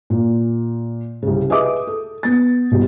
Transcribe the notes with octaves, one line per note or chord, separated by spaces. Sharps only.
A#2
C2 C#3
G#4 B4 D#5 E5 D6 D#6
A4
B3 A6
C2 B2